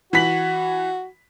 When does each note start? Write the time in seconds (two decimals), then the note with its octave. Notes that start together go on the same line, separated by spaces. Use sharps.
0.13 E3 F#4 B6 F#7